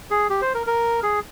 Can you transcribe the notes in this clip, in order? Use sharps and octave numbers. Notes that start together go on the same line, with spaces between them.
G#4
G4
C5
A#4
A#4
G#4